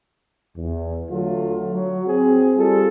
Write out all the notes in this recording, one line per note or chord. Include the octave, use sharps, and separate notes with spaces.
E2
D3 F#3 A3 F4
F#3
C4 G#4
G3 C4 F4 G#4 A4